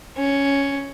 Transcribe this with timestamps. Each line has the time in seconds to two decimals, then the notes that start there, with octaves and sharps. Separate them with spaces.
0.17 C#4